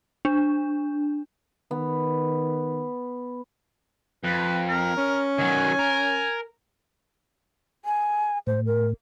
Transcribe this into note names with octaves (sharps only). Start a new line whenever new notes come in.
D4
D#3 B3
F2 B4
A#4
C#4
D#3 F#3 G#5
A#4
G#5
A2 C5
A#4